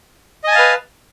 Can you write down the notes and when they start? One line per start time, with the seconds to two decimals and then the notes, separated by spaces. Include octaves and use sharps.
0.44 D#5
0.48 G#5
0.51 A5
0.55 F5
0.59 B4